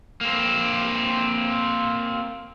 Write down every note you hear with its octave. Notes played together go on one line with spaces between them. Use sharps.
A#3 C4